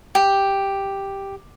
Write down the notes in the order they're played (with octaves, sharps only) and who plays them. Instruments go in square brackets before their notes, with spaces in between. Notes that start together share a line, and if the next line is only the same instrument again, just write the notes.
[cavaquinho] G4